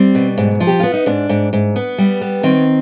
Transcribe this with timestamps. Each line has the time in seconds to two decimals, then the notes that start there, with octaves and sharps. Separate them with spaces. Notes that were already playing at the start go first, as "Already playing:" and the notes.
Already playing: G3 C4
0.15 B2
0.38 G#2
0.60 F3
0.67 G4
0.80 B3 F4
0.93 D#4
1.06 G#2 D4
1.29 G#2
1.53 G#2
1.76 B3
1.98 G3
2.21 B3
2.43 D#3 C4